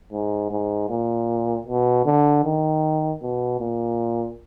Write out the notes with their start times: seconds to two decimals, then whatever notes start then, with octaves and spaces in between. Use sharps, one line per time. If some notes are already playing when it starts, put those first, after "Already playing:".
0.13 G#2
0.51 G#2
0.90 A#2
1.67 B2
2.06 D3
2.44 D#3
3.22 B2
3.61 A#2